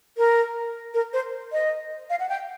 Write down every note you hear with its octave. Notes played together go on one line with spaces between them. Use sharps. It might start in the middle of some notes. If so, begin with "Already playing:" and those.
A#4
A#4
C5
D#5
F5
F#5
G5